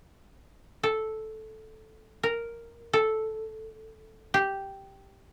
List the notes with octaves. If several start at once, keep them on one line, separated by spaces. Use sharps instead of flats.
A4
A#4
A4
G4